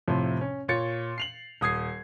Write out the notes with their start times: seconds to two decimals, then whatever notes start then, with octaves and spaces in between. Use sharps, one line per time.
0.08 F2 A2 C3 F3
0.41 C#4
0.68 A#2 C#5 A6 C#7
1.18 C7 F7 F#7
1.61 D#1 D#6 G#6 C7